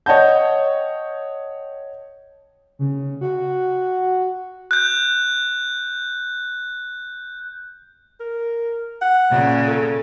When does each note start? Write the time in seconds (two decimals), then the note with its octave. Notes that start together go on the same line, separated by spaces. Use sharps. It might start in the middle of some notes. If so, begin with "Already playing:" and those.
0.06 C#5 D#5 F#5 G5 A5 G6
2.79 C#3
3.21 F#4
4.71 F#6 G6
8.20 A#4
9.02 F#5
9.31 A#2 C#3
9.68 A4